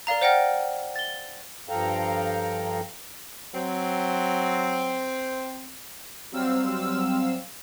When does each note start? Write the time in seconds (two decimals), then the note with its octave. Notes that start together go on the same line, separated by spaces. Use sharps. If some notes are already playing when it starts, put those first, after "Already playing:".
0.07 A#4 D5 F5 A#5
0.21 C5 D5 F#5 G5 F6 A#6
0.96 A6 G7
1.69 G2 F3 A4 F5 G5 A#5
3.55 F#3 C4
6.32 F#3 G3 C4 F5 E6